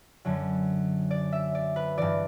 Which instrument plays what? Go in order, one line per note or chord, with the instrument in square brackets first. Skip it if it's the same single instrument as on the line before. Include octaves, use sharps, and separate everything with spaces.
[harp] F#2 D3 F#3
D5
E5
D5
B4
G2 E3 D5